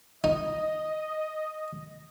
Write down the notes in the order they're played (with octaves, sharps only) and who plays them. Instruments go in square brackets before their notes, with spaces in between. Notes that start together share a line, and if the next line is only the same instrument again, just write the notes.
[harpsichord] D#4 [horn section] D#5